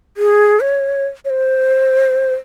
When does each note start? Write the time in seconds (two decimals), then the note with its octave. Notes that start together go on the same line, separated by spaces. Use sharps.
0.17 G#4
0.60 C#5
1.25 C#5
1.30 C5